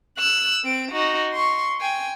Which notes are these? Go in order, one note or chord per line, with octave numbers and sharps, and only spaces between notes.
E6 F#6
C4 D7
D#4 F#4
C6 C#6
G5 G#5